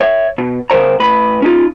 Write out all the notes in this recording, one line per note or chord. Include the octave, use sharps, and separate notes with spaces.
C#5 E5
B2
C#3 A#4 C5 C#5 A#5
A2 B4 B5
C#4 D#4 F4